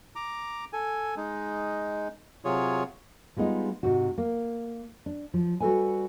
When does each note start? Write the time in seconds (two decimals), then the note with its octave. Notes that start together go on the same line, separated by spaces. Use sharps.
0.16 A#5 D6
0.73 A4 G#5
1.17 G#3 D#4
2.45 C3 F#3 F4 G#4 C#5
3.37 G3 G#3 B3 D#4 F4
3.83 G#2 C3 F#4
4.18 A#3
5.06 D4
5.34 F3
5.60 G3 F#4 G#4 A4 B4 G#5